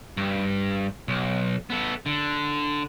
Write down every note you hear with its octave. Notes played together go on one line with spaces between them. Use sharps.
G2
B1
B3 A4
D3